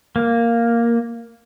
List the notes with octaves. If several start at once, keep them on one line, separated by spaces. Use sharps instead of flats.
A#3